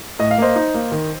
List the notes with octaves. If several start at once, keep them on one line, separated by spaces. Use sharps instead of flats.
A2 D#5
F5
A#3 C5 D#5
D#4
A#3
D#3